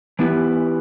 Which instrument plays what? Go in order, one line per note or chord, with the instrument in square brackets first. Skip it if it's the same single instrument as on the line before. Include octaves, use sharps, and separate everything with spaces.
[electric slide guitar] E3 B3 E4 G4 B4